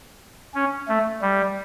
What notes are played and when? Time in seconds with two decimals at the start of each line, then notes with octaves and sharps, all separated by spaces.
0.54 C#4
0.88 A3
1.22 G3